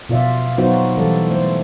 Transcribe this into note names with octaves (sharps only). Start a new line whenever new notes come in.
B2 F4 D5 E5
F#3 B3 D#4 F4 F#4 C5
E3 G3 A4 D5
A3 C5